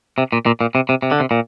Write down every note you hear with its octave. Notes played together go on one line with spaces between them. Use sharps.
C3
A#2
A#2
A#2
C3
C3
C3
D3
C3
A#2